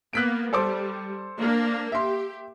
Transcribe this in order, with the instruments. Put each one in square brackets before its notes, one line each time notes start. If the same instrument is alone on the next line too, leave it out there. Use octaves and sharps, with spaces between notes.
[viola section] A#3 B3 [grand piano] F#6 B6 D7
[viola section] G3 [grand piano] A4 C5 D6
[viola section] A#3 D4
[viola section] G4 [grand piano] E5 C6